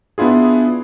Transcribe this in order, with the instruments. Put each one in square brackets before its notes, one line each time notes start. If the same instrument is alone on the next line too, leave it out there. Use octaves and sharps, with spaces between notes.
[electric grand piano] B3 D4 E4 F4 G#4